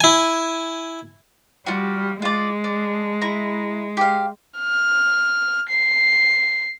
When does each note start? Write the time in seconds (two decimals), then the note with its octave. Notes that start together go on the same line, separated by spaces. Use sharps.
0.01 E4 G#5
1.66 G3 F4 F#4
2.22 G#3 F4 D5
2.64 D4
3.21 E4 A#5
3.97 G4 F5
4.59 F6
5.69 C7